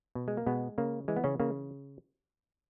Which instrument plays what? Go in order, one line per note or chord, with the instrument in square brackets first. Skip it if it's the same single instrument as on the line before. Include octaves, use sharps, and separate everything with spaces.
[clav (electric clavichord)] B2
G#3
A#3
B2 G#3 B3
C#3 A#3
E3 G#3
B3
C#3 C#4
C#3 A#3